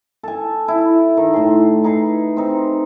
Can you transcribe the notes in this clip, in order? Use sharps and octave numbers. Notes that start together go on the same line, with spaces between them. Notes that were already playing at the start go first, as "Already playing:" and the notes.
A4 G#5
E4
D#3
A2 C6
D#4 G#4 B4
C4 D#4